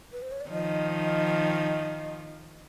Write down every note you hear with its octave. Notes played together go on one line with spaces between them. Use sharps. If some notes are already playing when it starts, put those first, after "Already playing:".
B4
C5
C#5
D5
D#3 F3 D#5